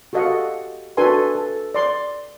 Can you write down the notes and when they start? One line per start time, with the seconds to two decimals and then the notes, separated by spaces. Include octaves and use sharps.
0.13 F#4 G4 A4 D#5 F5 F#5
0.97 D4 F#4 A4 B4 G#5 C6
1.35 A4
1.75 D5 C6